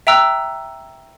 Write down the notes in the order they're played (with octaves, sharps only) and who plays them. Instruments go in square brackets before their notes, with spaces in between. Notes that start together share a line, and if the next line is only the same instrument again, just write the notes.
[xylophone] E5 G5 A#5 E6 F#6